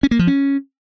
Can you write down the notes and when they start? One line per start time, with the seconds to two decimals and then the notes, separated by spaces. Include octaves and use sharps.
0.03 C#4
0.11 A#3
0.19 F3
0.27 C#4